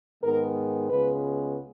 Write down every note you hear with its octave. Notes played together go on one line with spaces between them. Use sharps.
G#2 D#3 G#3 B3 A#4
C#2 C#3 G#3 B3 B4